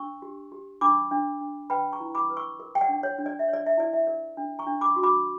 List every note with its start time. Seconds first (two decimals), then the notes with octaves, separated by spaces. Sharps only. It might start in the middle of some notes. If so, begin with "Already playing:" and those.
Already playing: D4 C#6 E6
0.22 G4
0.52 G4
0.81 D4 B5 D6
1.11 D4
1.41 D4
1.70 B4 G5 B5
1.93 A#5 C#6
2.00 E4
2.15 B5 D6
2.30 B4
2.37 C#6 E6
2.60 A#4
2.75 G5
2.81 D5 F#5
2.89 D4
3.03 C#5
3.18 D4
3.26 D5
3.39 E5
3.48 C#5
3.53 D5
3.66 E5
3.78 E4 D5
3.93 E5
4.07 A#4 D5
4.37 D4
4.59 A#5 C#6
4.67 D4
4.81 B5 D6
4.96 F#4
5.03 B5 D6